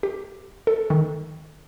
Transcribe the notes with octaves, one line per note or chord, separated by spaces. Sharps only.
G4
A4
D#3